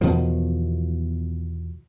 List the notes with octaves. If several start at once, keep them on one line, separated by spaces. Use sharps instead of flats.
E2 B2 D#3 F3